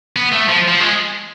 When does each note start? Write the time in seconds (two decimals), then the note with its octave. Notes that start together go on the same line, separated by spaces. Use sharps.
0.16 B3
0.32 A3
0.48 F3
0.68 F3
0.80 G#3